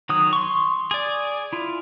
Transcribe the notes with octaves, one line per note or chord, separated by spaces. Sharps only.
D#3 F#3 D#6
C6 C#6
G#4 D5
E4 F4